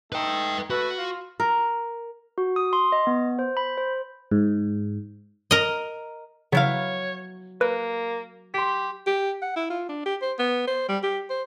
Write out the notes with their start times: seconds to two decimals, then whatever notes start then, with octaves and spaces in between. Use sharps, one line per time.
0.12 A3 D#4 B4 G5
0.70 A3 F#4 B4
0.97 F4
1.40 A#4
2.38 F#4
2.56 D#6
2.73 C6
2.92 D#5
3.07 B3
3.39 C5
3.57 B5
3.78 C5
4.32 G#2
5.51 A#4 D#5
6.52 C#3 F#3 B3 E4 C#5 F5
7.61 A#3 B4
8.54 G4 C6 B6
9.07 G4
9.42 F#5
9.56 E4
9.70 F4
9.89 D4
10.06 G4
10.22 C5
10.39 B3
10.68 C5
10.89 G3
11.03 G4
11.30 C5